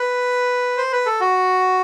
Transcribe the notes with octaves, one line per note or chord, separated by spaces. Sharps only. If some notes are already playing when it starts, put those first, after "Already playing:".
Already playing: B4
C5
B4
A4
F#4